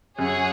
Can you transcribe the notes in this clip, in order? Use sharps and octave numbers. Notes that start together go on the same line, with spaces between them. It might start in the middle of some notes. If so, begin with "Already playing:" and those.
F#2 G#4 C#5 F#5